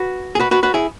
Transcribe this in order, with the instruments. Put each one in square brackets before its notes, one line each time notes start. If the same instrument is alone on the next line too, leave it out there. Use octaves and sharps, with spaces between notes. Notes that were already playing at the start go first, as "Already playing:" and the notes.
Already playing: [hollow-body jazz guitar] F#4 B4
G#4
F#4 B4
F#4 B4
F#4 B4
E4 G#4